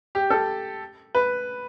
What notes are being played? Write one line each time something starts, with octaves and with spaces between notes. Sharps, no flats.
G4
A4
B4